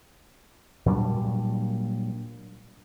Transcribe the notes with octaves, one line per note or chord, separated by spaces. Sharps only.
A#2 F#3 G3 D4